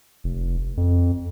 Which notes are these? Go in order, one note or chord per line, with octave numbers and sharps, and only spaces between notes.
F1
F2